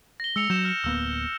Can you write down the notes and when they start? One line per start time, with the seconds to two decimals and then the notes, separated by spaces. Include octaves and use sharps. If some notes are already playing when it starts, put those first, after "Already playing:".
0.20 A#6 G7
0.36 G#3 E6 C#7 F7
0.50 F#3 G6 E7
0.65 F6 C#7
0.84 D1 A#3 B3 E6